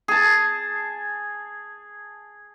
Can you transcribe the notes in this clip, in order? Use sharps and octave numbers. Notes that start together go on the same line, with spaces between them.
G#4 A5